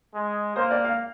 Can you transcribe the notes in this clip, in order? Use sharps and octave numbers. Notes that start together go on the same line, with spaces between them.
G#3
A#3 C5
D5
F5